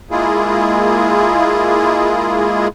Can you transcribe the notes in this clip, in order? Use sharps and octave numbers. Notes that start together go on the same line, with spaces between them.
G#3 A#3 E4 F4 G#4